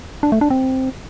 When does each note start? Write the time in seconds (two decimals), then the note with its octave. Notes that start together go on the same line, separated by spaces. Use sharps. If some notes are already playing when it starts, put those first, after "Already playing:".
0.23 D4
0.32 A3
0.41 D4
0.50 C4